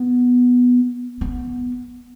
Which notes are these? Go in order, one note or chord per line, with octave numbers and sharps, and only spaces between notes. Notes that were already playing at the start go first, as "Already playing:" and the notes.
Already playing: B3
B3